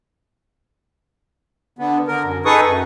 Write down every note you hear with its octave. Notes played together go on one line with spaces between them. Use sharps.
D3 B3
D3 A#4
F#2
D#4 G#4 A4 B4 C#6 D#6
F#2